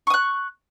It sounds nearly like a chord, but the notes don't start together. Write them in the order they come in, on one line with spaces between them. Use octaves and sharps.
C#6 D#6 F#6